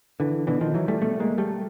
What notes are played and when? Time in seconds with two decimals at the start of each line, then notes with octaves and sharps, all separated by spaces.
0.20 D3 E3
0.47 B2 D3 E3
0.61 D#3 F3
0.74 E3 F#3
0.88 G3 A3
1.02 B2 G3 A3
1.20 G#3 A#3
1.38 G3 A3